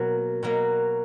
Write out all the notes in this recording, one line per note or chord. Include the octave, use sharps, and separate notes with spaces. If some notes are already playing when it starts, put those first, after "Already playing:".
Already playing: B2 F#3 A#3
B2 F#3 A#3